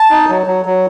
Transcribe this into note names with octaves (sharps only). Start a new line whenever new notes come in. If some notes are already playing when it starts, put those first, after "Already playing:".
Already playing: A5
D#4
F#3
F#3
F#3